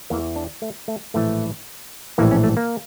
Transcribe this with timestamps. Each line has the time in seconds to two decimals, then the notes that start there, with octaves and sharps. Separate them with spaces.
0.10 E2 E3 A#3
0.36 D4
0.62 A3
0.88 A3
1.14 A#1 A2 E3 A3
2.18 A#1 A2 E3 A#3
2.31 C#4
2.44 A3
2.57 A#3